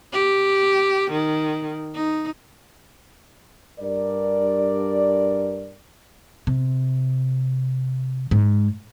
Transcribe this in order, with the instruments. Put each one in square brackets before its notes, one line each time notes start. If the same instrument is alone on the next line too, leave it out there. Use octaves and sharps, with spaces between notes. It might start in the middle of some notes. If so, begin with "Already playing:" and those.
[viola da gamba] G4
D#3
D#4
[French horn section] G2 A#4 D5
[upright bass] C3
G#2